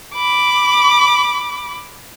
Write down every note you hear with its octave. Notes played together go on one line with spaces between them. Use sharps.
B5 D6